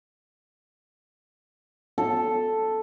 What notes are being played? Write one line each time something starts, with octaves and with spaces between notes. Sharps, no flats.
A4